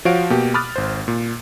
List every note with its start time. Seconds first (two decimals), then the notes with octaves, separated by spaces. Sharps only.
0.05 F3 F#4 C#5 F5 D7
0.30 B2 A#3 G4
0.54 B5 D6 D#6 F6 F#6 A6
0.76 G#1 C5
1.08 A#2